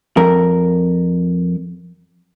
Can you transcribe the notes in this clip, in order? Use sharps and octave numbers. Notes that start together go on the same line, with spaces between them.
F2 A#4